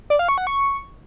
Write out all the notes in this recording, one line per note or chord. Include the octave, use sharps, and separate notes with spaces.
D5
F5
C#6
F#5
C#6